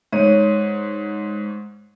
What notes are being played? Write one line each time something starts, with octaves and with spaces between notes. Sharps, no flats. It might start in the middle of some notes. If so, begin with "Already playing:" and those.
G#2 C#5 D#7